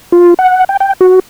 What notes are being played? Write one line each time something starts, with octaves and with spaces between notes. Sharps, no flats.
F4
F#5
G5
G5
F#4